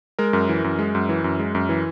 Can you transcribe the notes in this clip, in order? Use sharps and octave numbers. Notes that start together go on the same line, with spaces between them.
G#3 A#4
F#2
E3
F#2
G#3
F#2
E3
F#2
G#3
F#2
E3